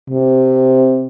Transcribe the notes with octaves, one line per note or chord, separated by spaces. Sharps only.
C3